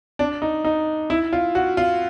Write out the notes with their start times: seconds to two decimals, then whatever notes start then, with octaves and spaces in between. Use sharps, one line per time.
0.19 D4
0.42 D#4
0.65 D#4
1.10 E4
1.33 F4
1.55 F#4
1.77 F4